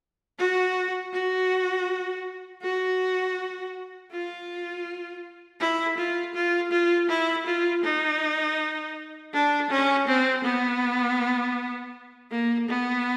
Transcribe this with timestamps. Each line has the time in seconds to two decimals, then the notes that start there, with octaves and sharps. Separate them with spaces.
0.39 F#4
1.13 F#4
2.62 F#4
4.12 F4
5.60 E4
5.98 F4
6.34 F4
6.71 F4
7.09 E4
7.47 F4
7.84 D#4
9.33 D4
9.70 C#4
10.07 C4
10.44 B3
12.31 A#3
12.68 B3